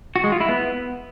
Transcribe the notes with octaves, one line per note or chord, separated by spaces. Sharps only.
F#4
G#3
F4
E4
B3